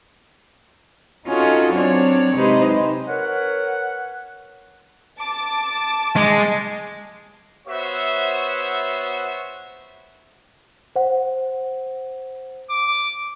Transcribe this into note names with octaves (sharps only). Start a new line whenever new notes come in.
C#4 D#4 F4 F#4 G#4 A4
F#3 C4 D4 C#5 D5 F6
C3 G#3 D#4 G4 B4 C5
A#4 B4 C#5 F#5
A5 D6
G#3
B3 F#4 C5 C#5 E5
C5 F#5
D6